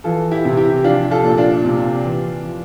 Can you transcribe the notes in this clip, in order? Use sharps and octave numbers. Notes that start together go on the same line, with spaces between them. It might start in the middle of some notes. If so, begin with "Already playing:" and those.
E3 F4 A4
E4 G4
C3
E4 G4
F3 D4 F4
F4 A4
A#2
D4 F4
C3
E3
F3